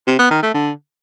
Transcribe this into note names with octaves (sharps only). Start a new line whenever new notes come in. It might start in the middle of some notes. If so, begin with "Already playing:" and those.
C3
B3
D#3
A3
D3